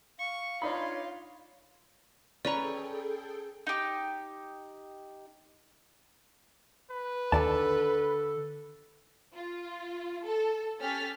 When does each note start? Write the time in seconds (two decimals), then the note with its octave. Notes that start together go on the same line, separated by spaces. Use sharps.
0.19 F5 C#6
0.62 D4 D#4 F4 C#5 B5
2.45 C#4 G#4 A4 B4 D5 G5 A#5 C#6
3.67 D#4 G4
6.91 B4
7.32 D#2 D3 A4 D5 A5
9.34 F4
10.25 A4
10.80 C#4 G4 A4 F6 A6 B6